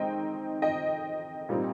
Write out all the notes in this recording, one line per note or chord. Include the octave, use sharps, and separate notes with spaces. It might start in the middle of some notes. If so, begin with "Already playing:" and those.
Already playing: D#3 G#3 C4 D#4 D#5 G5
D#5 G5
A#2 G3 C4 D#4